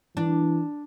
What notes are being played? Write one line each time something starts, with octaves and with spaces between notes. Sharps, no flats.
E3 D4